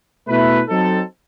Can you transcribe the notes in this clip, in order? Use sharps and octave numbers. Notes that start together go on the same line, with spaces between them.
B2 A3 E4 B4
F#3 C4 D#4 A4